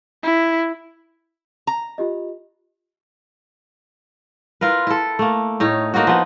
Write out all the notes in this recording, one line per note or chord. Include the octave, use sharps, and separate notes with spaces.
E4
A#5
F4 G4 D#5
E4 F4 A#4 B4
E4 A4
A3 A#3
A2 D#4 C#5
A#3 D#4 F4 F#4
F3 B3